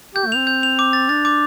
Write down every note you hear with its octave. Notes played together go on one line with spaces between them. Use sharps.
G4 G6
A3
C4 F7
G6
F7
D6
A6
D4 A6
D6